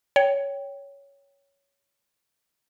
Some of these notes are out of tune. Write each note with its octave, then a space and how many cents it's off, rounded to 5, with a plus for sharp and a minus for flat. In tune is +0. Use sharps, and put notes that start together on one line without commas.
C#5 +10 G5 +0